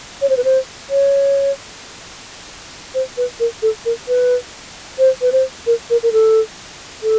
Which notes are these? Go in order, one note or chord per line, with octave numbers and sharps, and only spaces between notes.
C#5
C5
B4
C5
C#5
C5
B4
A#4
A4
A#4
B4
C5
B4
C5
A#4
A#4
A#4
A4
A4